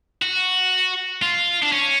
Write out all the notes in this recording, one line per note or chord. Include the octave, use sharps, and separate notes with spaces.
F#4
F4
D4
C#4